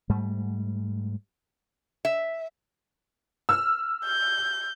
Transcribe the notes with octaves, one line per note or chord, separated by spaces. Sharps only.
G#2 G3 A3
E5
E6 F6
G6